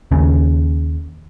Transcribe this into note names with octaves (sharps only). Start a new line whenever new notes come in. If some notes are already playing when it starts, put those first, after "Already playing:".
D#2 C#3